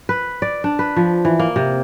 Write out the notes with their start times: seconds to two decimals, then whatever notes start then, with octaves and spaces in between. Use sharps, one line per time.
0.09 B4
0.42 D5
0.64 D4
0.79 B4
0.96 F3
1.25 E3
1.39 A#3
1.56 C3